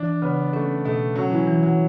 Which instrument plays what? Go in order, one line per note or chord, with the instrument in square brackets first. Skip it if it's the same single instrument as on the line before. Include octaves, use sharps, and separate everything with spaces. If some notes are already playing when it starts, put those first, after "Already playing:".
Already playing: [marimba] E3 [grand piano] D4
[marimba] C#3 [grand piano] B3
[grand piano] A3 [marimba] C#4
[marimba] B2 [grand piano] A3
[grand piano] F#3 [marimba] C#4
[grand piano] E3
[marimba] E3
[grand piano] F#3